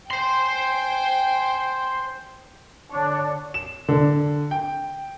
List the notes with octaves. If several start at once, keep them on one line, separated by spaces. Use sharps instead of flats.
C5 G5 G#5 C6
D3 D4 C#5
E7
D3
G5